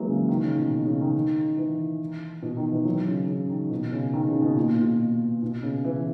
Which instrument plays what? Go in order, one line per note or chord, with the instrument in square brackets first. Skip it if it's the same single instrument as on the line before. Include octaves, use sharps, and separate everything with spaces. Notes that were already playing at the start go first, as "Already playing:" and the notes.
Already playing: [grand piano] E3 F#3 G#3 A#3
C#3
D#3
C#3
B2
C#3
D#3
E3
B2
D#3
E3
F#3
C#3
C#3
D#3
B2
C#3
D#3
C#3
B2
A#2
B2
B2
C#3
E3